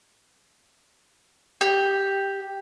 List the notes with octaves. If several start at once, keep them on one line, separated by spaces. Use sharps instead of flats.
G4